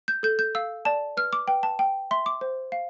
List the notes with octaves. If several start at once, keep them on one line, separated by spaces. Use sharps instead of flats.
G6
A4 G6
G6
F5 E6
D5 A5
B4 F6
D6
B4 G5
A5
G5
E5 C6
D6
C5
F5